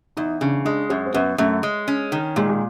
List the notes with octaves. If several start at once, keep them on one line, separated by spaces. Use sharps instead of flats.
E2 D#4
C#3 D4
G#3 D4
F#2 C#4
C4
F#2 B3
F#2 A3
G#3
C#4
D#3
A#2 G#3
G#3